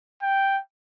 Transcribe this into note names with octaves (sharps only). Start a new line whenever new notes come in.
G5